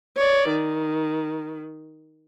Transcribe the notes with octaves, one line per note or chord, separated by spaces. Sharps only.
C#5 D5
D#3